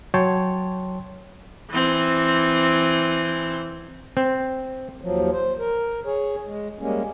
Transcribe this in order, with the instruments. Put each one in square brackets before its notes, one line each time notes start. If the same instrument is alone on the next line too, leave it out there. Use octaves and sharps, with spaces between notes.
[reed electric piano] F#3 C#5 G5 A5 C6
[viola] E3 C4
[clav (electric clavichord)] C4
[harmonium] D#2 F3 F#3
C5
A#4
G#4 C#5
G#3
G3 G#3 A#3 C#4